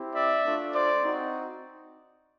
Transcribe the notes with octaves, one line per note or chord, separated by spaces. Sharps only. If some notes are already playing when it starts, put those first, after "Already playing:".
Already playing: C4 E4 G4
D5 E5
A3 D4 F4
C5 D5
C4 D#4 F#4